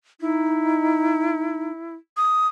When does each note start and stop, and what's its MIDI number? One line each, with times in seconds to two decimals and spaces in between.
0.21 1.71 63
0.21 1.94 64
2.17 2.48 87